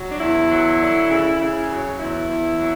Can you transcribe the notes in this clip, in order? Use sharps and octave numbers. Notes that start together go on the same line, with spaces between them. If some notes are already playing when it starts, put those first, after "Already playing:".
Already playing: F#3
D4
E2 E4
F#3
D3
C#3
C#3
F#3
E2 E4
E2
F#3